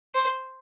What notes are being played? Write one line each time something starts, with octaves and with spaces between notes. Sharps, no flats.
C5